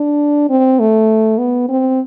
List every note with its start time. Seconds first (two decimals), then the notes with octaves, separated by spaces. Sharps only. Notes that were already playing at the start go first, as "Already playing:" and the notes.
Already playing: D4
0.50 C4
0.80 A3
1.38 B3
1.69 C4